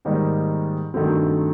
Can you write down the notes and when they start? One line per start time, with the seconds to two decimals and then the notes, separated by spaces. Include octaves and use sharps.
0.05 G#2 D#3 G3 A#3 D#4
0.94 G2 D#3 F#3 A3 C4